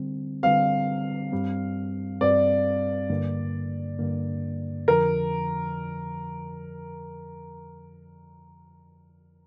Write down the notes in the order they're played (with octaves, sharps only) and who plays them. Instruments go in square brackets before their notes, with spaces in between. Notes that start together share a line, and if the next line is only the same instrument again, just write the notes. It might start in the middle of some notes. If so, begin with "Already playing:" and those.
Already playing: [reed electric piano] D3 G3 C4
[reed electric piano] D3 G3 C4 [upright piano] F5
[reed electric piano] G2 G3 C4
[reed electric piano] G2 G3 C4 [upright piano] D5
[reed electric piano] G2 D3 A#3
G2 D3 A#3
[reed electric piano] F2 D3 F3 [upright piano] A#4